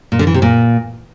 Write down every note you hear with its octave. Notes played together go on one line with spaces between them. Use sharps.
A#2
D3
E3
C3
A#2